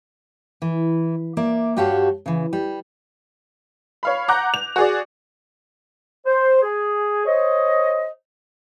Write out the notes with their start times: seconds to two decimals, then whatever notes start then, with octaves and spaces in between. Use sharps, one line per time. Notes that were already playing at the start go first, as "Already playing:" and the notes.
0.62 E3
1.37 A#3 D5 E5
1.77 G2 F#4 G4 C#5 F5 A5
2.26 C#3 E3
2.53 G3
4.03 C#5 F5 B5
4.28 F#5 A#5 D6 F#6 G6 A#6
4.54 F7
4.76 F#4 G#4 D5
6.26 C5
6.62 G#4
7.26 C5 C#5 D#5